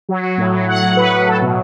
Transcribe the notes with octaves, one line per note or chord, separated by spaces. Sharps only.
F#3
F#3
A2
F#3
F#3 F#5
F#3
A2 B4
A2
F#3 A4
B2